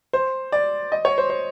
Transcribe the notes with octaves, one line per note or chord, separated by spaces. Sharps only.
C5
D5
D#5
C#5
C5
C5